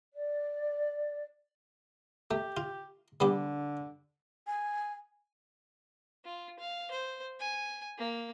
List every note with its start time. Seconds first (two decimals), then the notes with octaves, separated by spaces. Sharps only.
0.14 D5
2.31 A3 G4
2.57 F4
3.20 D3 G3 B3 G4
4.47 G#5
6.25 F4
6.59 F5
6.91 C5
7.39 G#5
7.98 A#3